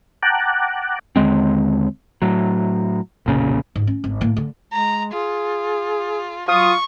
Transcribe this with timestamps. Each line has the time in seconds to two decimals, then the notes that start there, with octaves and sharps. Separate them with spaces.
0.23 F#5 G5 A5 A#5 D6 F#6
1.16 D#2 D3 G#3 C4
2.22 A2 F#3
3.26 F1 B1 A#2 C#3
3.76 G#2
3.87 C#4
4.04 G#1
4.21 A2 A#3
4.37 D3
4.72 G#3 A#5
5.13 F4 G#4
6.48 F#3 F4 C#6 D#6